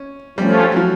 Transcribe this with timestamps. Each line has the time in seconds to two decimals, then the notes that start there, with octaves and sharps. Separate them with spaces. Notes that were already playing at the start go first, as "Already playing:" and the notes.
Already playing: C#4
0.38 F3 G3 A3 C#4 F4
0.72 F#3
0.76 F3